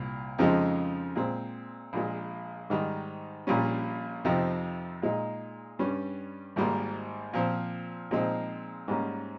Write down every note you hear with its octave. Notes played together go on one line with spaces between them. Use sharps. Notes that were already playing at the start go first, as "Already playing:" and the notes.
Already playing: C2 A#2
F2 C#3 F3 G#3 D#4
A#2 G#3 C4
A#1 A#2 G#3
G#2 D#3 G3
A#1 A#2 G3 C#4
F2 C3 F3 C4 D#4
A#2 G#3 D#4
G2 G3 C#4
G#1 G#2 G3 A#3
A#2 F3 C4
A#2 F3 G#3 C4 D#4
G#2 G3 A#3 C#4